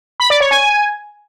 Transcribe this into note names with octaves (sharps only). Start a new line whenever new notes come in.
B5
D5
C#5
G#5